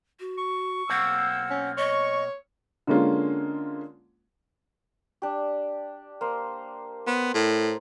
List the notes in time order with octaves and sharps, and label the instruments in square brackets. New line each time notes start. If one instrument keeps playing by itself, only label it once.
[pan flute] F#4
[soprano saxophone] C#6
[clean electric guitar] B1 A#3 C4 [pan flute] F#5 [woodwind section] E6
[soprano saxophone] C#4
[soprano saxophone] C#5 [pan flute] D#5 [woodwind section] C#6
[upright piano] D3 G#3 A#3 C#4 F4
[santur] D4 G4
A#3 C5
[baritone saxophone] B3 [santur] C5
[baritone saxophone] A2